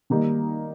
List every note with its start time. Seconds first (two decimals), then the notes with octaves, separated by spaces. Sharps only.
0.10 D#3 G3 A#3 D#4